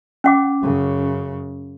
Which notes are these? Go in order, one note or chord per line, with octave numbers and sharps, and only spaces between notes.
C#4 F#5 D6
F#2 C#3